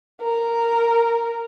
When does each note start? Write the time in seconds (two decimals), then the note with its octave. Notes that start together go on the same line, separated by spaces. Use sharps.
0.22 A#4